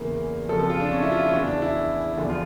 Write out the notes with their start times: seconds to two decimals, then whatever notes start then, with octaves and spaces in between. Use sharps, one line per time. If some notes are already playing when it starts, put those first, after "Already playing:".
Already playing: E2 C#3 E3 A#3
0.48 F2 C#3 F3 A4
0.59 A4
0.69 F4
0.80 D4
0.92 C#4
1.02 E4
1.12 F4
1.23 E4
1.29 C#4
1.33 E2 C#3 E3 D4
1.48 D4
1.62 E4
2.17 E2 D3 F3
2.29 F4